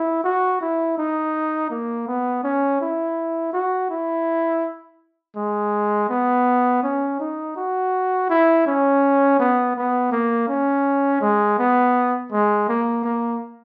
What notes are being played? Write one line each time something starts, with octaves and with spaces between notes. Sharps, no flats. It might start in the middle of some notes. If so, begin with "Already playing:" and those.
Already playing: E4
F#4
E4
D#4
A#3
B3
C#4
E4
F#4
E4
G#3
B3
C#4
D#4
F#4
E4
C#4
B3
B3
A#3
C#4
G#3
B3
G#3
A#3
A#3